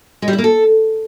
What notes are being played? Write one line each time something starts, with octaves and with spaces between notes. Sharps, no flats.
G#3
G3
E4
A#3
A4